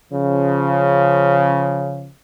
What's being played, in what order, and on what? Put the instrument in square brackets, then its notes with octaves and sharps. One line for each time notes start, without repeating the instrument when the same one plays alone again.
[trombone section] C#3 F3